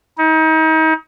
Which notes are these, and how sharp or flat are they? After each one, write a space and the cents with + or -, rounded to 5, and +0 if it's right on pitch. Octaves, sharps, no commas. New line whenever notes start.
D#4 +35